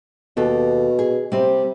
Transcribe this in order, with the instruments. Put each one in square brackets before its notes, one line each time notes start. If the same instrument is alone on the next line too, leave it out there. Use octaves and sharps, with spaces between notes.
[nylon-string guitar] D#2 G4 A4 [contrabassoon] B2
[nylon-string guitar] G#4
[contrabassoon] C3 [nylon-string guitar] G3 C4